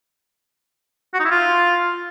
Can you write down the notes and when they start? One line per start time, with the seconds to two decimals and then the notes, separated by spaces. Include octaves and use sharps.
1.14 F#4
1.20 D#4
1.25 E4
1.31 F4